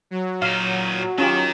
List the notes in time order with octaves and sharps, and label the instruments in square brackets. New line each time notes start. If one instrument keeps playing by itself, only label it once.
[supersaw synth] F#3
[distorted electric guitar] A#2 D#4 [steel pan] F5
[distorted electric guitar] D#3 [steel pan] C#4 F4 G4